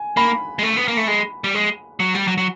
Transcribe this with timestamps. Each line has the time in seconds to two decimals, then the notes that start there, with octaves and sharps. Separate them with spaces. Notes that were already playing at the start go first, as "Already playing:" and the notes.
Already playing: G#5
0.17 A#3 B5
0.59 G#3
0.63 A3
0.77 B3
0.88 A#3
0.97 A3
1.08 G#3
1.44 G3
1.55 G#3
2.00 F#3
2.15 G3
2.28 F#3
2.38 F#3